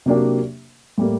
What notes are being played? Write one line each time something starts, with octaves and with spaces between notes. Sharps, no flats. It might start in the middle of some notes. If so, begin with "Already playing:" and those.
C3 F#3 A#3 D4 G4
A2 G3 A#3